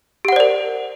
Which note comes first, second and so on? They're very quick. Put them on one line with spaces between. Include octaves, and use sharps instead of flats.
G4 F#5 C5 D5 A#4